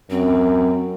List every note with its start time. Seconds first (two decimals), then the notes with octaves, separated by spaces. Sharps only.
0.10 F#2 C4